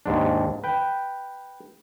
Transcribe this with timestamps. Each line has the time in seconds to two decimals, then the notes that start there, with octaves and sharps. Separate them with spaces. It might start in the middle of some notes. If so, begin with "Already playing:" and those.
0.06 D#2 G#2 D4
0.64 B4 G5